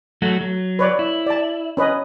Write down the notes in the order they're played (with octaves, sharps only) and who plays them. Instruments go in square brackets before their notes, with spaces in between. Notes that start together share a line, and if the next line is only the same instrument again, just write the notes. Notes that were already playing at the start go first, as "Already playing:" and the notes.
[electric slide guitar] F#3 A3 F#4
F#3
[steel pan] B4 C#5 D5
[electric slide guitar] E4
[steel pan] D5 A5
C#4 B4 D#5